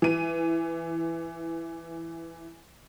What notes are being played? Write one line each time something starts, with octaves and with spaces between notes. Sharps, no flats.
E3 D#7